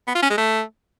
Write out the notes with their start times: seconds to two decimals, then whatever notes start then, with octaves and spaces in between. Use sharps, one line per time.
0.07 B3
0.15 F4
0.22 C#4
0.30 G#3
0.38 A3